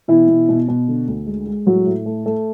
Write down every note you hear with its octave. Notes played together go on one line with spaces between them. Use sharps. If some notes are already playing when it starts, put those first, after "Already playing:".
B2 E3 E4
B2
B2
B2
D3
D2
G#3
G#3
A2 F#3 F#4
A2
A3
A3